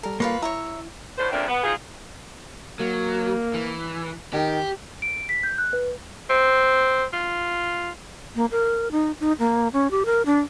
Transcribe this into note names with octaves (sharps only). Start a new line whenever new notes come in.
G3 A4 A#4
A#3 F4 B4 C#5
E4 C#5 E5 A#5 E6
A2 D3 C5
A#2 C#3 A3 A#3 C4 D4
B3
C4 D#4 F4 G#4
F#3 A#3
E3
D#3 G4
D7
B6
G6
F#6
B4
C4
F4
A#3
A#4
D#4
D#4
A#3
C#4
G4
A#4
D4